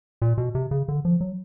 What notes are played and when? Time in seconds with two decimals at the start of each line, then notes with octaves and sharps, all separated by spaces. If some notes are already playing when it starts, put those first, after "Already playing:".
0.22 A#2
0.38 B2
0.55 C3
0.71 C#3
0.88 D3
1.05 F3
1.20 F#3